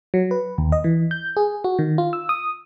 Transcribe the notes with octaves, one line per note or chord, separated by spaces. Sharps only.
F#3
B4
D#2
D#5
E3
G6
G#4
F#4
D#3
F4
E6
D#6